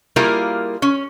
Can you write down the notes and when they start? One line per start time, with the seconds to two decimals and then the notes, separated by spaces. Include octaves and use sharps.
0.16 G3 A#3 E4 F4 G#4 A#4
0.82 C#4